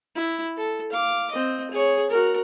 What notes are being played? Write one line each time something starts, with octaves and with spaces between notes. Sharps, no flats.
E4
A4
F5 D6
C4 D#5
G#4 C#5
F#4 A#4